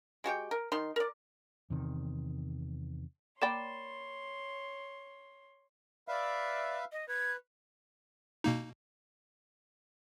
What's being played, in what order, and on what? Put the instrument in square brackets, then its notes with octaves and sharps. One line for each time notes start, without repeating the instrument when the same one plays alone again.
[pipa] G#3 F#4 G4 G5
A#4
D#3 D#4 C6
A#4 D5
[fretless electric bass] E2 C3 D#3
[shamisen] A#3 D5 G5 [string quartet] C#5 C6 [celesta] B5 A6 E7
[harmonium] B4 E5 F5 [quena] D5
[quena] D#5
[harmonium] B4 [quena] G#6
[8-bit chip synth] B2 A#3 D#4